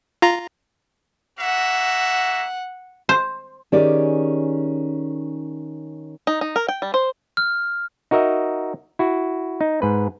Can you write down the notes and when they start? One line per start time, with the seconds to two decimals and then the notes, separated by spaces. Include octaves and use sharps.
0.22 F4 A#5
1.40 A#3 F#4 E5 F#5
3.09 C5
3.72 D#3 C#4 G4 G#4 D5
6.27 D#4
6.41 D#4
6.56 A#4
6.68 G5
6.82 G3
6.94 C5
7.37 F6
8.11 D#4 F#4 A#4 D#5 E5
8.99 E4 F#4
9.61 D#4
9.82 G#2 B4